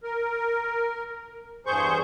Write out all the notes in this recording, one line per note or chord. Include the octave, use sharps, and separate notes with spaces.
A#4
E2 G2 G#4 C5 C#6 G6